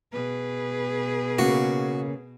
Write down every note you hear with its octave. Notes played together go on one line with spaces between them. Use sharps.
B2 G#4 B4
C#3 A#3 F#4